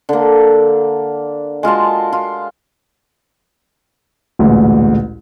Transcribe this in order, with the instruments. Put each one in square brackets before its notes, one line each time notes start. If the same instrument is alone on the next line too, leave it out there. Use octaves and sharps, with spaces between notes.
[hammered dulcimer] D3 A#3
G#3 F4 F#4 A5
F4
[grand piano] A1 D2 A#2 G#3